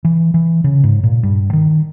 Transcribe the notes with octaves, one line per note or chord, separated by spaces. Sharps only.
E3
E3
C#3
G#2
A#2
G2
D#3